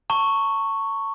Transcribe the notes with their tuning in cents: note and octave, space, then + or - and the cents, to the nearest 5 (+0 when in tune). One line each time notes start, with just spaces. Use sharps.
A5 +40 C#6 +0